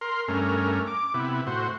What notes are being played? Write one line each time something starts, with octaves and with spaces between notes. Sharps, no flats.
A#4 C6
G2 A3 C#4 A#4
D6
C3 B3 E4
A2 F#4 C5